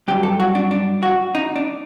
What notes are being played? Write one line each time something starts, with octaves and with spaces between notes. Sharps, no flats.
G2 F#3 G4
A4
F#4
D4
D4
F#4
D#4
D4